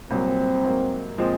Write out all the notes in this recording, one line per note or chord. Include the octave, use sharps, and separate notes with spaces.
C2 A#2 F#3 C4
G#2 F#3 A#3
A#2 F3 G#3 C4